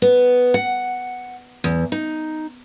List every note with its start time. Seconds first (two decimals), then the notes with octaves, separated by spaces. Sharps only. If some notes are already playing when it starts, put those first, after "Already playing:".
0.02 B3
0.54 F#5
1.64 E2
1.92 D#4